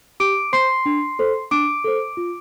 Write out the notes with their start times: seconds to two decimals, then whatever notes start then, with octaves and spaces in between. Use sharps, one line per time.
0.20 G4 D6 D7
0.53 C5 C6 C7
0.86 D4
1.19 A4 C5
1.51 D4 D6 D7
1.84 A4 C5
2.17 F4